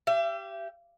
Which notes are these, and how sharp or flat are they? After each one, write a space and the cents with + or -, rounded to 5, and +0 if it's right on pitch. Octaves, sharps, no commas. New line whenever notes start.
G4 -10 E5 +40